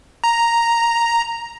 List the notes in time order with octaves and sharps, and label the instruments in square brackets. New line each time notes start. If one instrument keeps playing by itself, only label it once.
[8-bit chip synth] A#5